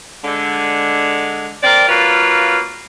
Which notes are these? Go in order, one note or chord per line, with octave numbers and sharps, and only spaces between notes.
D3 G#3
C4 A#4 D5
F#3 A#3 F4 B4